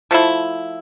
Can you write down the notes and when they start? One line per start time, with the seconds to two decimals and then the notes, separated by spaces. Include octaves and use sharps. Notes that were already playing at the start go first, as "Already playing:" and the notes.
0.11 F3 A3 E4